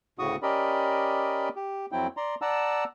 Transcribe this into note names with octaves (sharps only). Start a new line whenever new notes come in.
D2 A2 C#3 F#4 C#6 D#6
C#4 G4 A#4 D5 D#5 B5
G4
F2 F#3 C4 E4 G5
D5 A#5 C6
D5 F#5 A5 A#5 E6